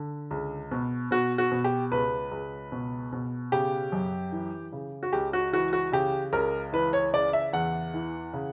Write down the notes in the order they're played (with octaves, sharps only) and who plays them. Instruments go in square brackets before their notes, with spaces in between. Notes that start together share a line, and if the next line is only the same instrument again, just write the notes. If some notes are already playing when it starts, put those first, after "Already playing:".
Already playing: [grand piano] D3
C#2
B2
B2 F#4
F#4
B2
G4
C#2 B4
C#2
B2
B2
C#3 G4
F#2
E3
C#3
F#4
C#2 G4
F#4
E3 F#4
F#4
C#3 G4
C#2 A#4
E3 B4
C#5
C#3 D5
E5
E2 F#5
E3
C#3